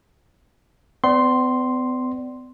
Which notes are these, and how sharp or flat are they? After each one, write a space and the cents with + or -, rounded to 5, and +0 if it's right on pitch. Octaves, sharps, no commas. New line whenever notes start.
B3 +45 D5 -5 C6 +0